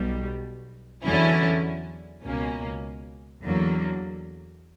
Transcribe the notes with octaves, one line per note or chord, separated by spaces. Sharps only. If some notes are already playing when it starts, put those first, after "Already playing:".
Already playing: B1 B2 G3
E2 D3 F#3 C#4 E4
C#2 B2 A#3 C#4
E2 D3 F#3 A#3